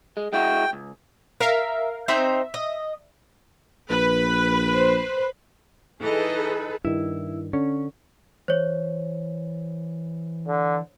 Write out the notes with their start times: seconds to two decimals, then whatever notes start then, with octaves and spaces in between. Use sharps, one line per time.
0.17 G#3
0.33 G#3 E4 F#4 G5
0.73 C#2
1.40 A#4 E5 F5
2.08 C4 D#4 C5 E5
2.54 D#5
3.90 A#1 B4
4.74 C5
6.01 E3 D#4 G#4 A4 B4 D#5
6.85 G2 D#3 E4
7.53 D3 C#4
8.48 E3 C5 C#5
10.47 D3